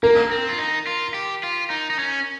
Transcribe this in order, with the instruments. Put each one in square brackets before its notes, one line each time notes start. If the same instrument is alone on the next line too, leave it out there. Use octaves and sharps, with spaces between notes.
[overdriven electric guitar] A#3 [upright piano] A#4
[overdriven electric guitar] C4
F4
D#4
F4
G4
F4
D#4
D#4
C#4